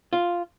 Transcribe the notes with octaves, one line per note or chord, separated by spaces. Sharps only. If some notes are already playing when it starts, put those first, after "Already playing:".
F4